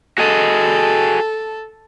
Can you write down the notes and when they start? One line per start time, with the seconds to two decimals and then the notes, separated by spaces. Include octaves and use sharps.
0.18 F#4 G#4 A4 D#5